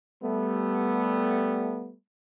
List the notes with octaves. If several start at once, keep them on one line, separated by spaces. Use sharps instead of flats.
G3 A3 B3